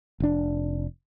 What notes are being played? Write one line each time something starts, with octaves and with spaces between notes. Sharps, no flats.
F1 D4